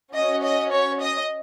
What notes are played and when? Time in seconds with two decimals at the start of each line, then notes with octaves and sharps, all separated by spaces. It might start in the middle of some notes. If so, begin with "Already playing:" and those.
0.14 C#4 F#4 D#5
0.42 D#5
0.71 C#5
0.99 D#5